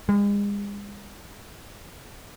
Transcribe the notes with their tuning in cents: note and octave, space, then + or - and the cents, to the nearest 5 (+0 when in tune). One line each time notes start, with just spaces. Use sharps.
G#3 -40